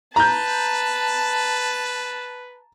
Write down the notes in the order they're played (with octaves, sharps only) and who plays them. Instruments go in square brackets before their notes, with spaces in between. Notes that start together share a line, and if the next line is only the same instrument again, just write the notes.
[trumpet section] B4 [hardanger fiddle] A5 [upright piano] A#5 G6